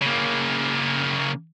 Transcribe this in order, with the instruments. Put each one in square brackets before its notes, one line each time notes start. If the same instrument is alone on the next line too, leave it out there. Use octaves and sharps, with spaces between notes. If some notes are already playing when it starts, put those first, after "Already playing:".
[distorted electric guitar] C#3 A#3